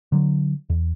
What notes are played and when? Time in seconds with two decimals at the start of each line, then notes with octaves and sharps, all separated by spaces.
0.12 D3 F#3
0.70 E2